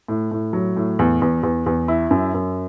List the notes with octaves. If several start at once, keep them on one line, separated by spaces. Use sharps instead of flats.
A2
A2
F#3
A2
E2
E2
E2
E2
E4
F#2
F#2